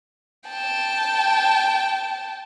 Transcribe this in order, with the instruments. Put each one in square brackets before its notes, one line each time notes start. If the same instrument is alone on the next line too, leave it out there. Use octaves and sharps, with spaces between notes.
[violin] G5 A5